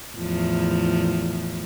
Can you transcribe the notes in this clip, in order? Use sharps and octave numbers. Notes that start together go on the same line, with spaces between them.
E2 A2 F3